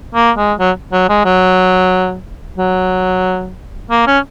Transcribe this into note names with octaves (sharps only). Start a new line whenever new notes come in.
A#3
G#3
F#3
F#3
G#3
F#3
F#3
A#3
C#4